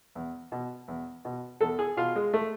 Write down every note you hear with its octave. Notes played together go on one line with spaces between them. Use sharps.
E2
B2
E2
B2
E2 A4
G#4
B2 F4
G#3
A3